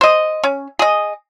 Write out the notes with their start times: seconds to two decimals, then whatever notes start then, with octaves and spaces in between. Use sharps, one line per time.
0.01 C5 D#5
0.44 C#4
0.79 G#4 D#5